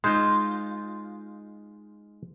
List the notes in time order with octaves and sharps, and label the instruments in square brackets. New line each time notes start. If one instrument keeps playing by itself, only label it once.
[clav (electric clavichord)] G#3 D#4 [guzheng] F4 C5